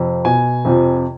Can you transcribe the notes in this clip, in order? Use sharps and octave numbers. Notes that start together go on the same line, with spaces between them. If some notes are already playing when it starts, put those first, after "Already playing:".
Already playing: F2 C3 F3
B2 G#5
F2 C3 F3